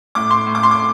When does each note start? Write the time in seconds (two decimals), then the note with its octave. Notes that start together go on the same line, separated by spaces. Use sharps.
0.15 A2 D6
0.31 C6
0.46 A2
0.55 D6
0.63 C6
0.71 D6